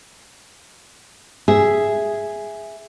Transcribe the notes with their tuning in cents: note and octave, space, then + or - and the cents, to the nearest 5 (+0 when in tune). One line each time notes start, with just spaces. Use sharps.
G#4 +0 E5 +0